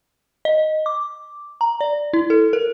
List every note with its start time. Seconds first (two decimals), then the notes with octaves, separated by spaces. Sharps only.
0.45 D#5
0.86 D6
1.61 A#5
1.81 D5
2.13 E4
2.30 A4
2.53 A#4